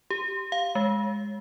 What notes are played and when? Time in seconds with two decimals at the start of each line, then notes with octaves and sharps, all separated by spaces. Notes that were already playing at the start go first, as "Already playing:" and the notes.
0.10 G4
0.52 F5
0.75 G#3